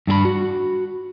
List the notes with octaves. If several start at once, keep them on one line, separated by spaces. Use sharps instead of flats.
G2 D4 G#4 B5
F#4